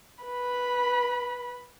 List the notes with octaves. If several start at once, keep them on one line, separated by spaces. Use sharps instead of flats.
B4 B5